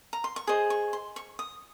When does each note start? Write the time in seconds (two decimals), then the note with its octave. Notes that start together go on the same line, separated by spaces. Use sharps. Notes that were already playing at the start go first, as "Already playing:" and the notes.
0.13 A#5
0.24 C6
0.36 C#6
0.47 G#4 C5 D#5 D#6
0.70 C#6
0.93 C6
1.16 C#6
1.39 D#6